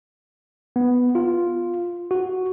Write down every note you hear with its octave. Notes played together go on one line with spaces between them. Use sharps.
B3
F4
F#4